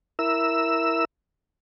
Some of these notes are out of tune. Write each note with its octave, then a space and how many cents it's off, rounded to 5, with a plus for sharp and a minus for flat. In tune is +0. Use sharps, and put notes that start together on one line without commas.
E4 +0 A#4 +0 E6 +0